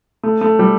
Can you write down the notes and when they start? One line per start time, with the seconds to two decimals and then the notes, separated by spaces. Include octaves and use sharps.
0.23 A3
0.41 A3
0.59 G3